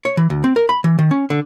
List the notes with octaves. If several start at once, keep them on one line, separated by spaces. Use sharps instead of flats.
C#5
E3
D2
C4
A#4
B5
E3
D#3
C#4
D3